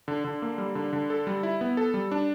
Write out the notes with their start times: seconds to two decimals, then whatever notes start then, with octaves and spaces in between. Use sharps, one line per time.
0.08 D3
0.24 D3
0.42 A#3
0.58 G3
0.75 D3
0.93 D3
1.10 A4
1.27 G3
1.43 E4
1.61 B3
1.77 A4
1.94 G3
2.11 D4